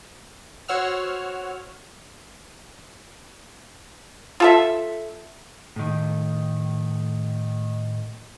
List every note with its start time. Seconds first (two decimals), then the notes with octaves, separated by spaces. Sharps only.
0.68 F#4 C5 C#5 F#5 E6 F6
4.40 F4 A4 E5
5.76 A2 D#3